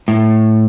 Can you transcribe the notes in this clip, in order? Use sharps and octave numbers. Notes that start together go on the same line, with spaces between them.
A2